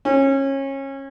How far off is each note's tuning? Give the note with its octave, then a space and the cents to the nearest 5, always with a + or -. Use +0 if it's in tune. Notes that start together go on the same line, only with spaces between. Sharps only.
C#4 -25